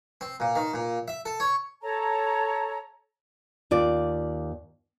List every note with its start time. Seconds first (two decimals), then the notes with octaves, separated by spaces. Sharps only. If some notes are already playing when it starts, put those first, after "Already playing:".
0.21 C4
0.40 A#2
0.56 D#3
0.73 A#2
1.08 E5
1.25 A4
1.40 C#5
1.82 A4 C#5 A5 A#5
3.71 D#2 F4 D5